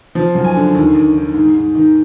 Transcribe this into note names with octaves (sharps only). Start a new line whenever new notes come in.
F3
F#2
G#5
D3
D#2
D#2
D#3
G#2
G#2
D#3